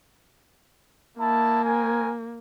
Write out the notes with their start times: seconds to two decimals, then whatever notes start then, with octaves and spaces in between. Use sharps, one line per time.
1.19 A#3 D#4 E4 A5
1.63 C4 A#4 G#5